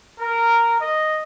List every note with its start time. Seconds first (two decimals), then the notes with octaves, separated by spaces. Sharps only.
0.20 A#4
0.80 D#5